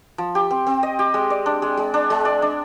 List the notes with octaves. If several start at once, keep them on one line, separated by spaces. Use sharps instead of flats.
F3
G4
C4
C4
D#5
G4
G#3
D5
D4
G#3
G#3
D4
G#3
D5
D4